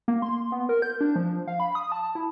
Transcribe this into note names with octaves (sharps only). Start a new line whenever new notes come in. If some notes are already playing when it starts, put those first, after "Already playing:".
A#3
C6
B3
A#4
G6
D4
F3
F5
B5
D#6
A5
E4